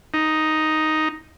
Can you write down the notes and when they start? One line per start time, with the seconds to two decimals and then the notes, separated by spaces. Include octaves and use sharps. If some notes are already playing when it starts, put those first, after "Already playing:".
0.14 D#4